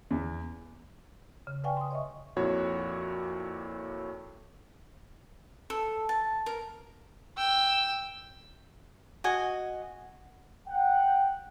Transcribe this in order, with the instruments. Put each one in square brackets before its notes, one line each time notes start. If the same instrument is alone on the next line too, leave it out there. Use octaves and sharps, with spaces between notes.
[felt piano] E2
[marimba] C#3
B4 D5 F5 G5 G#5 C#6
C6 D#6
C#5 D#5 E5 C#6
[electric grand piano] F2 A#2 E4 F#4 C#5
[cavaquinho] A4
A5
A#4
[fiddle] G5 E6
[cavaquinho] F#4 D#5 G#5
[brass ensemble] F#5 G5